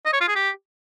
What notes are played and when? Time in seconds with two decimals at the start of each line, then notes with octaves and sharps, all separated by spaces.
0.06 D#5
0.13 C#5
0.21 F4
0.28 G#4
0.35 G4